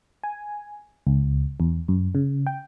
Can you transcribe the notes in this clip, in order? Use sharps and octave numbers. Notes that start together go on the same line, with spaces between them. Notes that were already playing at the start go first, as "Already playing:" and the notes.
G#5
C#2
E2
F#2
C#3
G5